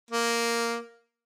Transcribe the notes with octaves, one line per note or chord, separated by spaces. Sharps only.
A#3